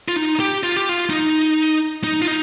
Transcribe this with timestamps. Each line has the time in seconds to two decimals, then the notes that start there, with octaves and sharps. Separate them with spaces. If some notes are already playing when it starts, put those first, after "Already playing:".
0.08 F4
0.16 D#4
0.40 G4
0.63 F4
0.77 G4
0.89 F4
1.10 D#4
2.04 D#4
2.22 F4
2.28 D#4